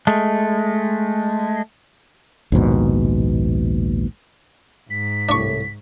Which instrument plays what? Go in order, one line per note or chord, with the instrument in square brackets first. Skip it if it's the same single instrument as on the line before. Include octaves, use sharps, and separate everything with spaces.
[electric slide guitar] G#3 A3
[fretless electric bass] A#1 D#2 G#2 B2
[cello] G#2 [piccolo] B6
[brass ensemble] C2 A2 [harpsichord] D4 C#6